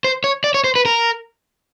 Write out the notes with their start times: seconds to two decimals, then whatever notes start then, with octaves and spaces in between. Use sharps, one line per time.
0.04 C5
0.24 C#5
0.44 D5
0.54 C#5
0.64 C5
0.75 B4
0.85 A#4